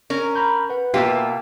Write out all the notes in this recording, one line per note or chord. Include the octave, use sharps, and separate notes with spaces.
C#4 A#4
A#5 B5 G6
B4 F#5
B2 A#3 F4 G4 E5